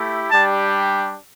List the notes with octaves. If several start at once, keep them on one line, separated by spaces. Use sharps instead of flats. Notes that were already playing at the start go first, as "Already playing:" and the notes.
Already playing: A3 E4 G4
G3 D4 G4 A5